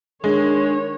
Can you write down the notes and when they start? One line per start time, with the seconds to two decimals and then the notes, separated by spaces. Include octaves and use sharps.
0.24 D#3 G#3 D4 C#5